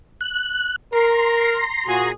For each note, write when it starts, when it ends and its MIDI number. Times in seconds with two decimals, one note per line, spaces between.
0.21 0.76 90
0.93 1.59 70
0.93 2.12 82
0.93 2.12 84
1.87 2.11 46
1.87 2.11 66
1.87 2.11 68